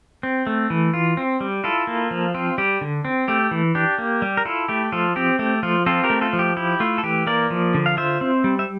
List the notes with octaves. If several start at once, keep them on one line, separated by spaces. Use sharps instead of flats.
C4
A3
E3
F4
C4
G3
E4 F4 A4
A#3
F3
C4 F4
G3 G4
D3
C4
A3 G4
E3
D4 G4
A#3
G3
A#4
E4 F4 A4
A3 G4
F3 F4 A4
C4 G4
A3 G4
F3 F4
C4 F4 A4
G4 A#4
A3
F4 A4
F3
G4
E4 G4
A3 F4
A4
E3 G4
A#3 A#4 D5
F3
D3
F5
F4 C5 E5
C4
G3
E5